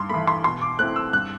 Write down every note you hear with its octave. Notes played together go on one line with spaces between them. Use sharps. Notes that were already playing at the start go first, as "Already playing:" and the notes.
Already playing: G2 C6
E3 A3 B5
C6
B2 C6
D6
A3 C4 E4 F#6
E6
G2 F#6